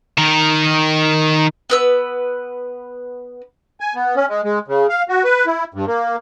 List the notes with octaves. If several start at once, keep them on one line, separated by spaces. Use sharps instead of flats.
D#3 A#4
B3 B4 E6
G#5
B3
C#4
G#3
G#3
C#3
F5
F#4
B4
E4
G2
A#3